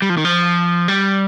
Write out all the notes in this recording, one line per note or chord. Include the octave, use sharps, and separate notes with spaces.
G3
F3
D#3
F3
G3